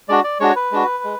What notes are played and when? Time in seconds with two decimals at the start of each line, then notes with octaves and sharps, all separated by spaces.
0.08 G#3 D4 F#4 D5
0.24 D5
0.40 G#3 D4 F#4 C#5
0.56 B4
0.72 G#3 D4 F#4
1.04 G#3